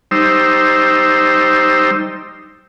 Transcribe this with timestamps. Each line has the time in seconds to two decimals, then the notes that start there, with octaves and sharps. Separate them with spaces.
0.11 G3 D#4 C5 E6